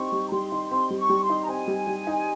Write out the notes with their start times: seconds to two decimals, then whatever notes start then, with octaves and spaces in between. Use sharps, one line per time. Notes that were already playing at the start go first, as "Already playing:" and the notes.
Already playing: G3 C4 D#4 C#6
0.12 G3
0.28 A#5
0.32 G3 C6
0.52 D#4
0.71 C4 C6
0.90 G3
0.97 C#6
1.10 G3
1.23 C6
1.29 D#4
1.43 A#5
1.48 C4 G#5
1.68 G3
1.87 G3
2.07 D#4